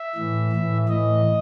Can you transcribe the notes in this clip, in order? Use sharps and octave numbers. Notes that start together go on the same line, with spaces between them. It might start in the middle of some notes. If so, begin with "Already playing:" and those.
Already playing: E5
A2 E3
A2 E3
A2 E3 D#5